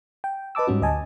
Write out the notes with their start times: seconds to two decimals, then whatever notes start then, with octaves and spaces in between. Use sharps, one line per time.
0.24 G5
0.55 B4 D#5 A5 D6 E6
0.67 G#2 G3 C#4 F#4
0.81 D2 D#5 G#5 A5